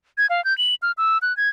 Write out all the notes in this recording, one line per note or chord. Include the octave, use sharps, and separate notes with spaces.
G#6
F5
G6
F#7
F6
E6
F#6
G#6